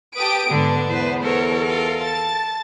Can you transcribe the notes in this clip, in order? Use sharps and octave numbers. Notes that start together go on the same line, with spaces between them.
G4 B4 A5 D#6 D7
G#2 D3 B3 D4
E2 B4 C5
A4 A#4 C5 C#5
F4 F5
A5 A6